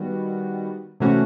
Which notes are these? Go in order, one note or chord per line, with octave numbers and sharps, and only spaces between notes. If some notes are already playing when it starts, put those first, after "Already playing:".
Already playing: D#3 G3 B3 F#4
C3 E3 A3 C#4 F#4